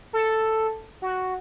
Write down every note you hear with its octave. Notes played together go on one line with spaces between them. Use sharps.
A4
F#4